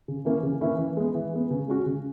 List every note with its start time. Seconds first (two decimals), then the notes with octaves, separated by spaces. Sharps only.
0.08 C#3
0.25 E3 A#3 C#4 E4
0.43 C#3
0.61 E3 A#3 C#4 E4
0.79 E3
0.97 G#3 B3
1.15 E3
1.33 G#3 B3
1.51 C#3
1.68 G#3 C#4 F#4
1.86 C#3